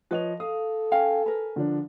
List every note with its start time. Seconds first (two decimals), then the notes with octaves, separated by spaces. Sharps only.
0.11 F3 B4 C#5 D#5 F7
0.40 A4 F5 D#6
0.92 C#4 F5 G5 G#5
1.26 A#4 B4
1.56 D3 F3 D4